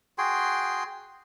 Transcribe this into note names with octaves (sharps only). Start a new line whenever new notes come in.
F#4 G#4 G5 C6